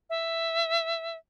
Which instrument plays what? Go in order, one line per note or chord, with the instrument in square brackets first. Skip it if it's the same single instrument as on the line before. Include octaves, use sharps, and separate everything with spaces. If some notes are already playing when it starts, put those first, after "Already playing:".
[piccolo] E5